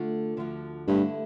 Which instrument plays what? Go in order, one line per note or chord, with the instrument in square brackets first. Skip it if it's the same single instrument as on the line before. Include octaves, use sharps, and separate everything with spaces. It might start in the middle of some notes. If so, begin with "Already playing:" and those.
Already playing: [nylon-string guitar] D3 A3 D4 F4
D2 D3 F3
[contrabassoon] G2 [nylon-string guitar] D3 A3 E4